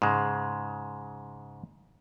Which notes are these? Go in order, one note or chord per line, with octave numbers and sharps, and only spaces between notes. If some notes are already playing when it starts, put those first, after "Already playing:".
G#2 C#3 G#3